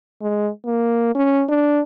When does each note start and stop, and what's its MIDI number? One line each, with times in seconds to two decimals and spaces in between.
0.22 0.49 56
0.65 1.12 58
1.15 1.44 61
1.49 1.80 62